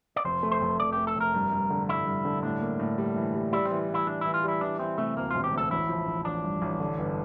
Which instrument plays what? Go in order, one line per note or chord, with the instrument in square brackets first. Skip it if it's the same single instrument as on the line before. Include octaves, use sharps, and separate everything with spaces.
[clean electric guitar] D5
[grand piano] F1 [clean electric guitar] C5
[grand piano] A3
[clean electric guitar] C5
[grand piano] F1
[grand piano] F1 [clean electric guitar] D5
[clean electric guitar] G4
[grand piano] A3
[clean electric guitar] A4
[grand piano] F1 [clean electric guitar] A#4
[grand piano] G2
G2
D3
[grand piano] G2 [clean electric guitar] E4
[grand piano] G2
D3
[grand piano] A2 [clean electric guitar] D4
[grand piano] A#3
A2
G3
E3
G3
[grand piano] G3 [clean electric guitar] E4
[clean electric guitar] C4
[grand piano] E3
E3
[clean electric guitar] E4
[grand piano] G3 [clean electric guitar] D4
[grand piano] E3 [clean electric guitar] E4
[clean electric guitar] F4
[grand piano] G3 [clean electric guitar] E4
[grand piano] E3 [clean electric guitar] D4
[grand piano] E3 [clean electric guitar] C4
[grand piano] C3 [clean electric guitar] A3
[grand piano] D2 [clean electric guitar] A#3
[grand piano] E1 [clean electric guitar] F4
[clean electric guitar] G4
[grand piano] D2 [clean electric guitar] A4
[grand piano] A1 [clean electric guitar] E4
[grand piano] F3
A1
[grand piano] A1 [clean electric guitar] D4
[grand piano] G2
A1
D3
G1